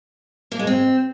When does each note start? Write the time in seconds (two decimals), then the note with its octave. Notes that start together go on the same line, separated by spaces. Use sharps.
0.52 A#3
0.59 G#3
0.67 C4